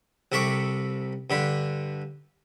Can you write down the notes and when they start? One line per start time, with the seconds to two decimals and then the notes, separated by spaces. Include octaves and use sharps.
0.32 C2 C3 A4 E5 C#6 D6
1.30 G2 D3 B5